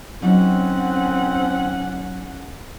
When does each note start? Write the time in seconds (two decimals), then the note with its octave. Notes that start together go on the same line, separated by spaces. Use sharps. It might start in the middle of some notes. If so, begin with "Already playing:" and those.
0.22 F#3 C4 C#4 D#4 F#5